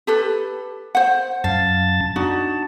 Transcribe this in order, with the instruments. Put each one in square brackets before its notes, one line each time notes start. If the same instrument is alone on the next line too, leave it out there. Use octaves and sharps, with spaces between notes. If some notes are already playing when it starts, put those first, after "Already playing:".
[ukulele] G4 A4 B4
C5 F#5
[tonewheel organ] F#2 A5 A6 [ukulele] F5
[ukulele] D4 D#4 F#4 [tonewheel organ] A5